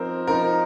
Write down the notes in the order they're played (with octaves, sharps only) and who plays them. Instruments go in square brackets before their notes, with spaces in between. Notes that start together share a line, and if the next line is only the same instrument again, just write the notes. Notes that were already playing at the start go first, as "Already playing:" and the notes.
Already playing: [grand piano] F3 C4 D#4 A#4
F3 C4 D#4 A#4